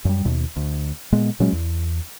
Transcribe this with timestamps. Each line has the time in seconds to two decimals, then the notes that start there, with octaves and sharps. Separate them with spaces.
0.05 F#2 G3
0.25 D#2 B2
0.56 D2
1.12 A#2 G#3 B3
1.40 A#2 F#3 G#3 C#4
1.53 E2